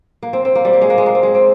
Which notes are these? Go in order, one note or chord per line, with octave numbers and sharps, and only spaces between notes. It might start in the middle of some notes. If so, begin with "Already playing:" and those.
A#3
C4
C4
A#3
G3
A#3
G#3
A#3
G#3
A#3
C4
G#3
C4